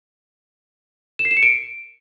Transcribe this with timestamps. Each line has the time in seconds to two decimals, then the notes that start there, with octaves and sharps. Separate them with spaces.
1.19 E7
1.25 C7
1.31 E7
1.37 C#7
1.43 D7